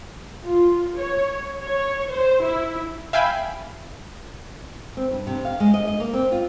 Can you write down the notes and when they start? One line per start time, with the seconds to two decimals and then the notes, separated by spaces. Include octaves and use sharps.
0.43 F4
0.97 C#5
1.62 C#5
2.10 C5
2.43 E4
3.13 E5 F5 G5 G#5 B5
4.97 C4
5.11 G2
5.27 C3
5.45 F5
5.60 G#3
5.74 D#5
5.87 D#5
6.00 A#3
6.14 C4
6.32 F4